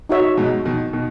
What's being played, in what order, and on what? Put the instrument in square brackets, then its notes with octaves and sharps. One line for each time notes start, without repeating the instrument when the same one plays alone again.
[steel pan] D#4 F#4 C#5 E5
[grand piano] G#2 B2
B2 D#3
B2 D#3